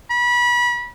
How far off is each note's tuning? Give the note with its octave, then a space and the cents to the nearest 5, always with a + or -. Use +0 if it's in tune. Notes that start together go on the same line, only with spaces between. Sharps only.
B5 -30